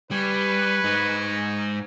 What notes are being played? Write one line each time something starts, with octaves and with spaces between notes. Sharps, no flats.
G3 B4 G#5 C#6
G#2 D#4